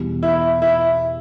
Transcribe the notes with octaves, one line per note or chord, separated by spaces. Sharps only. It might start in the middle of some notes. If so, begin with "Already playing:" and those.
Already playing: E2 B2 G3
E4
E4